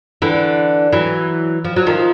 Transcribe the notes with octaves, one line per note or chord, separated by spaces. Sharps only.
D3 E3
E3 F#3
F3
F#3
D#3 F3